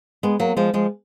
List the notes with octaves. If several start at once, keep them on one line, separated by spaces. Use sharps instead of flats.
G#3 B3
F#3 A#3
F3 G#3
F3 G#3